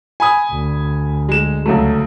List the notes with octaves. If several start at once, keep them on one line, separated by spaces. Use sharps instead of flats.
G#5 B5 D#6
D2
G#3 E7
C#2 F#3 A3